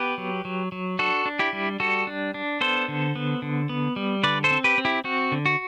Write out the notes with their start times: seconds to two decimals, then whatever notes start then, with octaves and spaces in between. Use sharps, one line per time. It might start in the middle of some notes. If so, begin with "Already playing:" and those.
Already playing: B3 G4 B4
0.18 F#3
0.45 F#3
0.72 F#3
0.99 D4 F#4 A4
1.26 D4
1.39 E4 G4
1.53 G3
1.80 G3 F#4 A4
2.07 D4
2.34 D4
2.61 B3 A4 C5
2.88 D3
3.15 B3
3.42 D3
3.69 B3
3.96 G3
4.23 D3 B4 D5
4.44 A4 C5
4.51 C4
4.64 G4 B4
4.78 C4
4.85 E4 G4
5.04 C4 F#4
5.32 D3
5.46 F#4